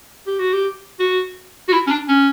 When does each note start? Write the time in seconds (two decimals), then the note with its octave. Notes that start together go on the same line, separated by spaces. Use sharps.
0.27 G4
0.39 F#4
0.53 G4
0.99 F#4
1.68 F#4
1.73 E4
1.87 C#4
1.91 D4
2.08 C#4